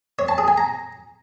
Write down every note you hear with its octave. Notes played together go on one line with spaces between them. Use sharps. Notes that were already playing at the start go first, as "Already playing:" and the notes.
C#5
A5
G#4
G#5
A#5